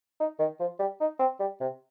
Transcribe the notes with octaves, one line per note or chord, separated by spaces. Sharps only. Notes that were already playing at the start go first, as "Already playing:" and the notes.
D#4
D#3
F3
G3
D#4
C4
G3
C3